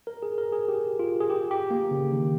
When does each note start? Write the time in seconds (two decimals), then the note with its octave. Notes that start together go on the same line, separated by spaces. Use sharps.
0.07 A#4
0.23 G#4
0.38 A#4
0.52 G#4
0.68 G4
0.99 F4
1.20 G#4
1.30 G4
1.51 G4
1.71 A#3
1.91 C#3
2.12 D#3